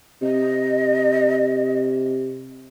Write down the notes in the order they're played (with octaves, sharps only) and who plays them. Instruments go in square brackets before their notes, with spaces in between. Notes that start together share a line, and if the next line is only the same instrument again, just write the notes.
[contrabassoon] C3 [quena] D#5